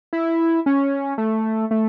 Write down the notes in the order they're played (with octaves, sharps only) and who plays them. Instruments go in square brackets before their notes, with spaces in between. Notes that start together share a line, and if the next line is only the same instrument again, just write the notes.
[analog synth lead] E4
C#4
A3
A3